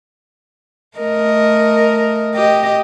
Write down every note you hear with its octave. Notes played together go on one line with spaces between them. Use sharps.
A3 A#4 D#5
G4 D#5